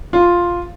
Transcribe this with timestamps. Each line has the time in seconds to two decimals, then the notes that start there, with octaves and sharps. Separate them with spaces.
0.13 F4